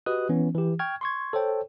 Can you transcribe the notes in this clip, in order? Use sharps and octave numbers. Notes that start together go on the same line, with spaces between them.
F#4 G4 B4 D#5 D#6 F#6
E3 B3 C#4
E3 G4
G5 C#6 F6 G#6
C6 C#6 G#6
A4 C5 C#5 G5